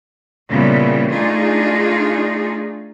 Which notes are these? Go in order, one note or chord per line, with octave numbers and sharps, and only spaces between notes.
A#2 C#3 E3 G3 B3
A3 D4 D#4 F4 G#4